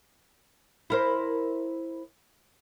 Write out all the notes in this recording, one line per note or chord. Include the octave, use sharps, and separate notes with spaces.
E4 A#4 C5